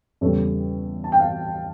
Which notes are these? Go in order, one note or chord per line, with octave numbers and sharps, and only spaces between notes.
E2 C#3 G3 A4 C#5
A5
G5
F5